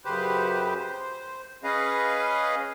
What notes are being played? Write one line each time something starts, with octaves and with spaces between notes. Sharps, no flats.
F#2 C#3 G4 B4 C5
C5
C#4 G#4 B4 D#5 F5